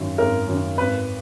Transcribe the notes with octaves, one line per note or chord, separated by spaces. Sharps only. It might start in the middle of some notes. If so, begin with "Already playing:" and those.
Already playing: G#1 F#2 D#3
G#1 A#4
F#2 D#3
G#1 B4